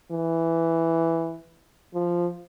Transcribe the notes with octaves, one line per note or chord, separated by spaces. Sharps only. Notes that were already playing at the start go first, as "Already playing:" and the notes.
E3
F3